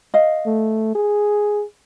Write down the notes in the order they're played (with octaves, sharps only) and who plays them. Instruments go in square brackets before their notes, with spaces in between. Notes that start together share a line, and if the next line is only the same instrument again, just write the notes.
[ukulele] D#5 F5
[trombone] A3
G#4